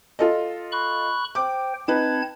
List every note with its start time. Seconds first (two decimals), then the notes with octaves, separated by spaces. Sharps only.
0.19 F4 A4 D#5
0.72 B5 C#6 F#6
1.35 C5 G5 D6
1.88 C4 D#4 B4 A5 G#6